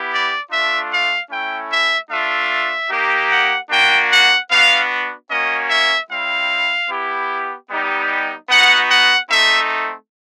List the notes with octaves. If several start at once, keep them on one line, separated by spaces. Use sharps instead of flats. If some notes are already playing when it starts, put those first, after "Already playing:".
Already playing: B3 E4 G4
D5
A3 D4 F4 E5
F5
A3 C#4 E4 G5
E5
A3 D4 F4 E5
A#3 D#4 G4
F#5
A#3 D4 F#4 G5
F#5
B3 D4 F#4 F5
A#3 C#4 F#4 D#5
E5
G3 C4 E4 F5
B3 E4 G4
G3 B3 D#4 G4
B3 D#4 F#4 F#5
F#5
A3 C4 D#4 E5